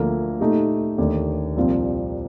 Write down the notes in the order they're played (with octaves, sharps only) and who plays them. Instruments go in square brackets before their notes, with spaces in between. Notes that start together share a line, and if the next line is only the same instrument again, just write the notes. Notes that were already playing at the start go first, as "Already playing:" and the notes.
Already playing: [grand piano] D2 D3 F3 A#3
A#2 A3 D#4 G4
D#2 D3 A3 D4
C2 A#2 F3 C4 F4